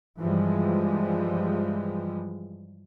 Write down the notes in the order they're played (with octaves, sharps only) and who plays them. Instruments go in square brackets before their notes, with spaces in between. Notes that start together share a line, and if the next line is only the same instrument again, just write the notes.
[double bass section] G2 E3 F3 G3 G#3